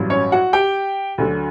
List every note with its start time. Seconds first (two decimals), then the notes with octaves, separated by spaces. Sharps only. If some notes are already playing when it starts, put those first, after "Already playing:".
Already playing: A1 G2 F#3
0.10 C#4 C#5
0.32 F#4 F#5
0.53 G4 G5
1.18 D2 D3 F#3